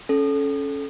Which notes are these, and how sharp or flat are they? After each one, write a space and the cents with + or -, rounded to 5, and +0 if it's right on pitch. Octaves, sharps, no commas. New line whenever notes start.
C#4 +0 A4 -20